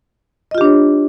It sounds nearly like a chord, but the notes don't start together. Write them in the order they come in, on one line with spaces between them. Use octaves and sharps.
D#5 F4 G4 D4 C#5